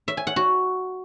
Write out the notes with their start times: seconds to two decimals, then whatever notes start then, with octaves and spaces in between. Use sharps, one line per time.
0.08 E5
0.17 G#5
0.27 F#5
0.36 F#4